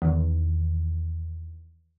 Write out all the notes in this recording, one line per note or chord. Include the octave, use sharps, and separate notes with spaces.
E2 D#3